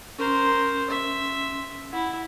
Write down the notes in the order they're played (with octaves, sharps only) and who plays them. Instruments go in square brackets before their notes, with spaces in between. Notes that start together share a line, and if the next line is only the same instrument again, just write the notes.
[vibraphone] C#4 C6 [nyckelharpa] A#4 C5
[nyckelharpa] E5
[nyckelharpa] E4 [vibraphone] F#5